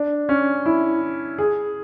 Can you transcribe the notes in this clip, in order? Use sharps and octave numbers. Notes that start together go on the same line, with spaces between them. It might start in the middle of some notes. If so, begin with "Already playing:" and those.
Already playing: D4
C#4
E4
G#4